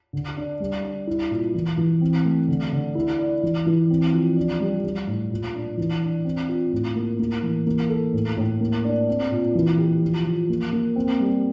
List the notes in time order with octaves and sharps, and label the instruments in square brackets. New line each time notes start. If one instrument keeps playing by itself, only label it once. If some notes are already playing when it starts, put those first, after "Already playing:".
[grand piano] D3
D4
G3
D4
E4
A#2
E3
E3
C4
A3
D3
D3
E4
D5
E3
E3
C4
F3
D4
G3
G3
A2
A#2
D4
E3
D4
C4
F4
A2
A#3
A#3
E3
A#3
A4
A2
A2
A#3
D4
C4
A#2
E3
G4
F3
F3
A#3
A#3
C4
G3